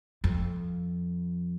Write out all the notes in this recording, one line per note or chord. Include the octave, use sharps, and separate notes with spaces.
F2